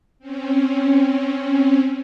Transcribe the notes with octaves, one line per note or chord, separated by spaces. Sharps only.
C4 C#4